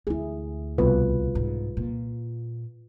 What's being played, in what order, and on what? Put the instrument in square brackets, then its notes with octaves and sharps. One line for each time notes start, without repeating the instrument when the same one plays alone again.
[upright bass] D2 [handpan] E4 G#4
[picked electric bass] C2 B2 [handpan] F4 B4
[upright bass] G#2
A#2